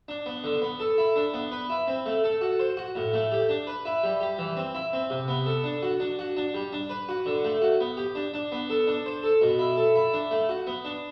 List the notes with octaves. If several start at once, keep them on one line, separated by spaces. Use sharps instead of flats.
D4
B3
D3
B3
A4
E4
D4
B3
B4
E4
C4
A3
A4
F#4
C5
F#4
A2
A3
G4
D4
B4
E4
G3
G4
E3
C4
E4
C4
C3
B3
A4
D4
F#4
D4
F#4
D4
G3
D4
B4
F#4
D3
A3
F#4
B3
G4
D4
D4
B3
A4
D4
C5
A4
B2
E4
A4
E4
D4
A3
F#4
B3
D4